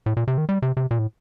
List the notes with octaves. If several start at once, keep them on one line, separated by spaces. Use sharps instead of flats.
A2
A#2
C3
D#3
G3
C3
C3
A#2
A2